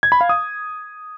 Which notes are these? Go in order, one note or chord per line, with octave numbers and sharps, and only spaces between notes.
G#6
B5
F5
D#6